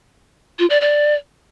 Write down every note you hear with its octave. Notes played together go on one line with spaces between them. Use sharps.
F4
D5
D5